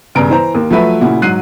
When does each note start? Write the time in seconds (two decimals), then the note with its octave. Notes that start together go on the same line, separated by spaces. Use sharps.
0.15 E1 G2 C#3 A#5 D7
0.30 E3 C5 A#5
0.55 D#2 A#3
0.71 F3 F#3 A3 B4 E5
1.01 A#2 C#3 E4 F#4
1.22 G#2 F#3 F#6 C7 D#7